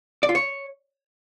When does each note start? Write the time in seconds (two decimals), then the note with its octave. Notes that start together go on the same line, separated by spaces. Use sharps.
0.23 D5
0.29 F4
0.35 C#5